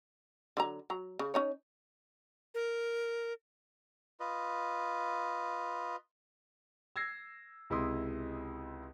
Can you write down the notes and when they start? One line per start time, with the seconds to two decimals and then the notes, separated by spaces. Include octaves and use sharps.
0.57 D3 F#3 A#5
0.90 F#3 A#5
1.19 C#3
1.34 C#4 D#4 C#5
2.54 A#4
4.20 F4 B4 D#5
6.96 E6 G#6 A#6 C7
7.70 C#2 C3 E4 D#5 C6 D#6